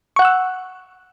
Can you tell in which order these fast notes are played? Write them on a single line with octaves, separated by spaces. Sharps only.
C#6 F#5 F#6 E6